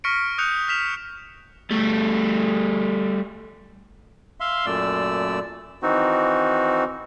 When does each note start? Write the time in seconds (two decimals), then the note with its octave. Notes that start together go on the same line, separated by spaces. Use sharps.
0.04 C#6 F6 A#6 B6 C#7 D7
0.38 D#6 F#6 G6 C#7 F7
0.68 F6 B6 E7 F7
1.71 G3 A3
4.40 E5 F5 C6
4.66 F#2 A#2 A3 D5 E6
5.82 D#3 E3 C4 D#4 F#4